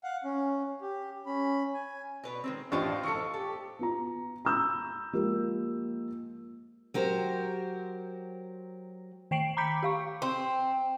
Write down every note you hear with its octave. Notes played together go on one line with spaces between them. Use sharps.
F5 F#5
C#4
G4
C#4 B5
G#5
B2 B4 C#5
D#3 G#3 C4
A1 D4 F4 C5 D#5 F5 G5 C#6
E3 G#3 A4 C#6 C#7
G4 A4
B3 F4 A#5
A#5 B5 E6 G6
F3 G#3 A#3 G4
F#3 G4 A#4 C5
D#3 G5 C7 D7 F#7
A#5 B5 D6 G6 B6 C#7
G4 F5 C#6
C4